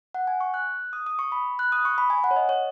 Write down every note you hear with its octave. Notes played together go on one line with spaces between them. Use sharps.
F#5
G#5
C#6
F#6
D#6
D#6
C#6
B5
F#6
D#6
C#6
B5
G#5
F#5
C#5
D#5
C#5